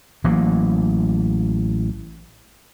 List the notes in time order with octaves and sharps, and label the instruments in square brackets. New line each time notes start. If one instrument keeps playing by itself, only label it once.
[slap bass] A1 E3 F#3 A#3